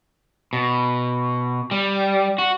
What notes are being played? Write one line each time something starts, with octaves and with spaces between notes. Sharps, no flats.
B2
G3
F#4